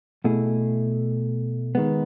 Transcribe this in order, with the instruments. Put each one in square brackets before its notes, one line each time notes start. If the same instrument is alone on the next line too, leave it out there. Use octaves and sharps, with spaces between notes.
[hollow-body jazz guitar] B2 A3 E4 G#4
D#3 G#3 B3